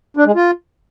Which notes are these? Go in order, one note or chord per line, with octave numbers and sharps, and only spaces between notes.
D4
G#3
F4